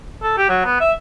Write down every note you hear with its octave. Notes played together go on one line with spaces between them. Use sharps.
A4
G4
F#3
B3
E5